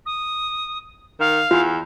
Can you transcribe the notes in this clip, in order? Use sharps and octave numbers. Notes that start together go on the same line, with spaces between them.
D#6
D#3 F5
E2 F4